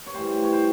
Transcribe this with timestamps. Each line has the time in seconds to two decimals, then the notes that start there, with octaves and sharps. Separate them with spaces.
0.06 C#5
0.14 A2 E3 G3 C5
0.44 C#5
0.53 C5